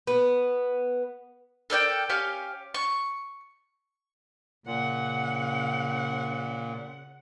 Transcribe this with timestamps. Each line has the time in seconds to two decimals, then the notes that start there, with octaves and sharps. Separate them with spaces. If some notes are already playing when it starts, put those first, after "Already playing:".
0.07 B3
1.70 A4 A#4 D5 G5
2.09 C#4 G4 F5
2.74 C#6
4.67 A#2 C#3 F#5